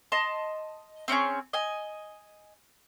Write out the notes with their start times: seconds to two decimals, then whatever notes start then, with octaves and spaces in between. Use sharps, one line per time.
0.12 D#5 A5 C6
1.08 C4 C#4 D#4 G#4
1.53 D#5 G#5